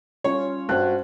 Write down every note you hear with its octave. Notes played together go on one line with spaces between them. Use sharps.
G3 C#4 F4 C#5
G2 F#4 C5 F#6